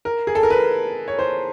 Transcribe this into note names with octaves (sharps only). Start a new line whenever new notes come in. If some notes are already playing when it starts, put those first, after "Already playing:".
A#4
G#4
A4
A#4
B4
C#5
C5